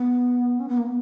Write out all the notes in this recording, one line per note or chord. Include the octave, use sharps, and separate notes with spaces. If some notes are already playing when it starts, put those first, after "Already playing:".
Already playing: B3
C#4
B3
A#3
B3